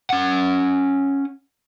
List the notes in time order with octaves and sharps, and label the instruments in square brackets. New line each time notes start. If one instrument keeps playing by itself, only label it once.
[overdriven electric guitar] C#4 F#5